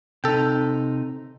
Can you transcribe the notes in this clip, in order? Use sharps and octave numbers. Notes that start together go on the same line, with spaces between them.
C3 D#4 A4 G5